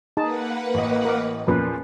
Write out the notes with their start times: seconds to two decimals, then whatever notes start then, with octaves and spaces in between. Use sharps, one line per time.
0.17 A#3 D#4 G#4 B4 F#5 A5
0.74 A1 D#5
1.05 A#4 D6
1.47 E2 A#2 F3 C#4 B4 A#5